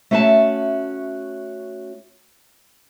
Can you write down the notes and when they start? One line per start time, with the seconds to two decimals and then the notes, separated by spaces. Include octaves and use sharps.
0.11 A3 C#4 F#4 E5 A5